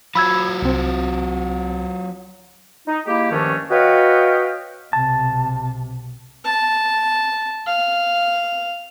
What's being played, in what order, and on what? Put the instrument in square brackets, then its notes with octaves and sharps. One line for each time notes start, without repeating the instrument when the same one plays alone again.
[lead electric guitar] F#3 F4 [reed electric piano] B5 E6 G#6
[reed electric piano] C2 C4
[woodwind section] D#4
G#3 A#3 E4 G4
G2 D#3 F3 A3 C#4 D4
F#4 B4 C#5 D#5 F5 G5
[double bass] B1 C3 [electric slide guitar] A5
[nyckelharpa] A5
F5